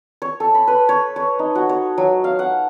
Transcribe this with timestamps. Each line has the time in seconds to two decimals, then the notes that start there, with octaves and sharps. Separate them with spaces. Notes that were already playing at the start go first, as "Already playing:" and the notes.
0.22 C#5
0.40 A4
0.55 B5
0.67 B4
0.89 C#5
1.16 C#5
1.39 D#4
1.55 F#4
1.69 C#5
1.98 F#3
2.24 F5
2.39 F#5